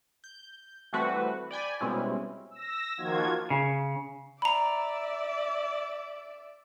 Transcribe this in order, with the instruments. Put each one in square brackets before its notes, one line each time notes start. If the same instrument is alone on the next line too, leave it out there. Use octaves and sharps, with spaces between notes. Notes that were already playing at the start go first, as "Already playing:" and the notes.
[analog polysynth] G6
E3 G3 A3 C4 F#4 B4
D5 G5 G#5 B5
B2 G3 G#3 C4 C#4 E4
[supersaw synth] E6 A#6
D#3 F3 A#3 F4 F#4 G#6
[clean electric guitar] C#3
[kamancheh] D5 E5 [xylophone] A#5 B5